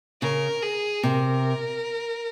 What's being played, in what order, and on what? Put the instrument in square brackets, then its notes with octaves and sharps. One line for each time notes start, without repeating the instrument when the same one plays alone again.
[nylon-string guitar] C#3 [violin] A#4
[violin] G#4
[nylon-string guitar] C3 [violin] A#4